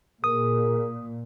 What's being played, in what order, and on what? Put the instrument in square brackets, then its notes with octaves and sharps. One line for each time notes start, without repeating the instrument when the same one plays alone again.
[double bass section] A#2 [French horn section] G#4 A#4 [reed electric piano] D#6